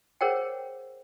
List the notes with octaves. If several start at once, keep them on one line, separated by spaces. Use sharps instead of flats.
G#4 A#4 C5 C#5 F#5 G5